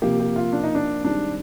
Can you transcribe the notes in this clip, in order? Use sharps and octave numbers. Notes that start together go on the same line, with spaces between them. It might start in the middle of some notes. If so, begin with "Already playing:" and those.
C3 F3 A#3 G4
G4
F4
D4
D#4
D4
G#2 D#3 G3 C4 D4